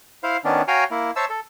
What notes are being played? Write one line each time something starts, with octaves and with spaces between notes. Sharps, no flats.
E4 C5 F5
D#3 B3 C#4 D4
F#4 C#5 F5 G5 G#5 A#5
A#3 E4
C5 C#5 E5 A5 E6
A4